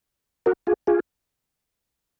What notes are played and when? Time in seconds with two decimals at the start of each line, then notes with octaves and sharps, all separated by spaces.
0.46 F#4 A#4
0.67 F4 G#4
0.87 F4 G#4